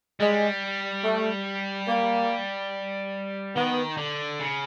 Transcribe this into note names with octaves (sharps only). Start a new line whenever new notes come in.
G3 G#3
A3
A#3
D#3 B3
D3
C#3